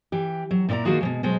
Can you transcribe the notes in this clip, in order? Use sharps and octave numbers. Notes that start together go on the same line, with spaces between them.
E3 G4
F#3
A#2 E4 F4 D5 A#5
D#3 E3 A#3 F4 F#4 G#4
B2 F#3 G#3
B2 F#3 G#3 C5